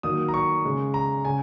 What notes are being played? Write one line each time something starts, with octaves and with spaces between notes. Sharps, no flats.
D#3 F#3 A#3 D#6
A#5
C#6
C#3 G#3
A#5
C#3 G#5